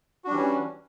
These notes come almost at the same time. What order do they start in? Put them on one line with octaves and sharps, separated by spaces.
F#4 D4 G3 E3 C#4